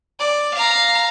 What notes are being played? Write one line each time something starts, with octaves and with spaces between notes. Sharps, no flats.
D5
F5 A#5